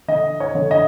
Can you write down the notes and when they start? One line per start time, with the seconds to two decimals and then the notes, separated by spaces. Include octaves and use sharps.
0.08 D3 D#5
0.40 C#5
0.55 D3
0.71 D#5